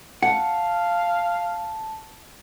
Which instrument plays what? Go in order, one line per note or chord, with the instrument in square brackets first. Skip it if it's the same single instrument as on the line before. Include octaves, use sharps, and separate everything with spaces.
[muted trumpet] F5 [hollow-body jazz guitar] F#5 [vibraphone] A5